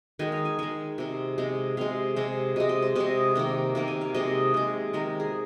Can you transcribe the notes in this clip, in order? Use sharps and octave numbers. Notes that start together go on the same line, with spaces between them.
D#3 G#3 G#5
F5
G#5
D#3 G#3 G#5
C3 G#3
C3 G#3
C3 G#3 F5
C3 G#3
C3 G#3 D#5
D#5
C5
C3 G#3 D#5
C3 D#3 A#3
C3 D#3 A#3
G#5
F5
C3 G#3 D#5
C3 G#3
D#3 G#3 A#4
G#4